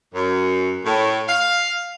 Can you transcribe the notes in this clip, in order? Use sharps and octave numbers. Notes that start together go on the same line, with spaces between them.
F#2
A2
F5